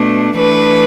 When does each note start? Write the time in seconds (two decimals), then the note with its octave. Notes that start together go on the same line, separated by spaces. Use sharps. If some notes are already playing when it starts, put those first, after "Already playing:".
Already playing: B2 A3 D4
0.36 E3 A3 D4 B4